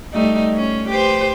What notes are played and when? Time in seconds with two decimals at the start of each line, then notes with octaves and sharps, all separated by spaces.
0.13 G3 A3 D#4
0.54 C#4
0.89 G4 B4 C5